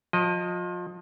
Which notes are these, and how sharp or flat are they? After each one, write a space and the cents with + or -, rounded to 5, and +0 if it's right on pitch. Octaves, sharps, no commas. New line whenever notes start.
F3 +30 D#5 +0